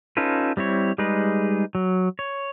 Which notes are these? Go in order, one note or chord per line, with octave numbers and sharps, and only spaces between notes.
C#4 D#4 F4 A4 B4
G3 C4 E4 C#5
G3 G#3 D#4 G#4 B4
F#3
C#5